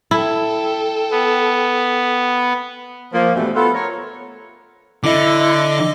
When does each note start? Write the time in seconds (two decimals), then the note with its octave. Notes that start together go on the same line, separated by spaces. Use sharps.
0.11 E4 A4 G5
1.11 B3
3.13 F3 A#3
3.35 G2 B2 E3 F3 G3 A3
3.55 B3 F4 A4
3.74 A#4 C#5
5.04 D3 E4 D#5 D6